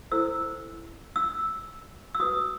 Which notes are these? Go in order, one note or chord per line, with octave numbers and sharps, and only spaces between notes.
E4 A4 C5 E6
E6
E6
F#4 B4 D#6